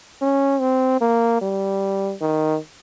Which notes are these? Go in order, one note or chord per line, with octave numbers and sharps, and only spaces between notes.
C#4
C4
A#3
G3
D#3